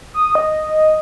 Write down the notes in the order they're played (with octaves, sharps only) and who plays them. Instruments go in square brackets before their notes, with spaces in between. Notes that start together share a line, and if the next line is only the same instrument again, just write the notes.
[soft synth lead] D#6
D#5